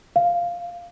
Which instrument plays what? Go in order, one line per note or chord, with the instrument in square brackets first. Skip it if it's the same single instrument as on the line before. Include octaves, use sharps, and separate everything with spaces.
[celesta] F5